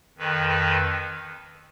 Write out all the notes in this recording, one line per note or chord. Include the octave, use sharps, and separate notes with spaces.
F2 D#3 B4
B4